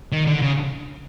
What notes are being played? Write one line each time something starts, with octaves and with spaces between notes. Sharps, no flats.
D#3
D3
C#3